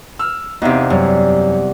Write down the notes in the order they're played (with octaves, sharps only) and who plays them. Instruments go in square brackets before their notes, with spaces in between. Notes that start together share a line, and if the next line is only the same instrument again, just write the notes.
[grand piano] E6 F6
[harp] E2 C3 [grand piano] D#4 E5 F5
[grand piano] F#2 C#5 [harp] G3